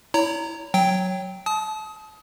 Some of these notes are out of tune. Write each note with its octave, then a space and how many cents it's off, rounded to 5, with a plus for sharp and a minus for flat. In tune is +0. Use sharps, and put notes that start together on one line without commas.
E4 +0 C#5 +35 A#5 -15
F#3 +0 G5 +0
A5 -30 D#6 +25